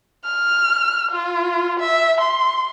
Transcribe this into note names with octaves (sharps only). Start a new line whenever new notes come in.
F6
F4
E5
C6